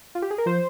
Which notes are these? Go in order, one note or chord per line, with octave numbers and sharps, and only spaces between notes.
F4
G4
G#4
A#4
F3 C5